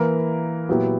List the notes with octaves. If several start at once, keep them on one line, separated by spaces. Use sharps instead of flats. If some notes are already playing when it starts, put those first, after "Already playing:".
Already playing: E3 A#3 E4 A#4
A#2 F#3 B3 E4 G4